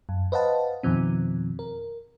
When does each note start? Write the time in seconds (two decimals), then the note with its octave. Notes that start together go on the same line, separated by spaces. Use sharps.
0.09 F#2
0.32 B4 C5 D#5 F5 F#5 A5
0.83 F2 B2 D#3 F3 C4
1.59 A#4